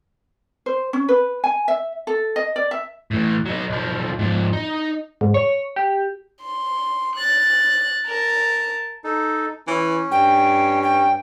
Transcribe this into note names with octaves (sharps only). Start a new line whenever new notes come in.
C5
C#4
B4
G#5
E5
A4
D#5
D5
E5
A2 E3
F#3 D#4
B1 F3
G#2 F3
D#4
G#2
C#5
G4
C6
F#6 A6
A#4 A5
D#4 A4
E3 C#4
G2 G5
G5